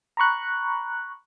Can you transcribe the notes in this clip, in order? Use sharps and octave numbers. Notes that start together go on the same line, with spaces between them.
A#5 B5 C#6 F#6